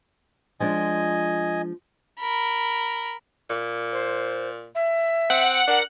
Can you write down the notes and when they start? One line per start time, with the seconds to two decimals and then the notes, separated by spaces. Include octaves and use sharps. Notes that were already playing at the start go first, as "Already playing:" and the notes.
0.60 F3 G#3 D4 D#5 G#5
2.19 A#4 B5
3.50 A#2
3.92 C5
4.75 E5
5.30 C4 F#5
5.68 D4 A#4